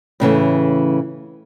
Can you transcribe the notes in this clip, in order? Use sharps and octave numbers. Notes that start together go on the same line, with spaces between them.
A2 C#3 E3 A3